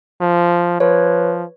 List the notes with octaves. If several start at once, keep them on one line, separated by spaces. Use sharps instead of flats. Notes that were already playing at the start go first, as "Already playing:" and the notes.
F3
F3 B4 C#5